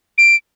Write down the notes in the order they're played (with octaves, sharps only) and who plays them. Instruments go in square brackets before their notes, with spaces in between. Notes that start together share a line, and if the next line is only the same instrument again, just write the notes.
[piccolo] D7